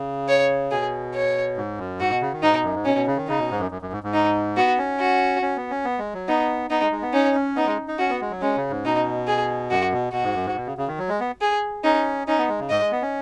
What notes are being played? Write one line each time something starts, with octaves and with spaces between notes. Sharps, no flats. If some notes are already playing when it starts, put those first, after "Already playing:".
Already playing: C#3
C#5
B2 G#4
C#5
G#2
F#2
G#2 F#4
B2
C#3
D#3
G#2 D#4
B2
F#2
G#2
B2 C#4
B2
C#3
D#3
C#3 D#4
B2
G#2
F#2
F#2
F#2
G#2
G#2
D#4
B3 F#4
C#4
F#4
C#4
B3
C#4
B3
G#3
F#3
B3 D#4
B3 D#4
G#3
G#3
B3
C#4 D#4
C#4
B3 D#4
G#3
D#4
C#4 F#4
B3
G#3
F#3
G#3 C#4
C#3
G#2
B2 D#4
G#4
F#2 F#4
B2
B2 F#4
G#2
F#2
G#2
B2
C#3
C#3
D#3
F#3
G#3
B3
G#4
C#4 D#4
C#4 D#4
B3
G#3
C#3
G#2 D#5
G#3
B3
C#4